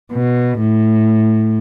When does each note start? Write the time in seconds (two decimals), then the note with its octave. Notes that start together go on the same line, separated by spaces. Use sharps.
0.13 B2
0.60 A2